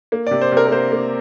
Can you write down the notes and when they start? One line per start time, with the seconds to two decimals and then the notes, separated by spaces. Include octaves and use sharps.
0.12 A#3
0.27 C3 D5
0.41 C5
0.52 C3
0.57 A#4
0.67 A#4
0.71 A#3 C5
0.92 A#3